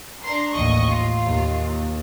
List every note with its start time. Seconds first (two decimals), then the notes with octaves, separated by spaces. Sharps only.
0.23 D4 A#5 C6
0.52 A1 D#2 A2 D#5 C#6
0.87 A2 F4
1.25 D#2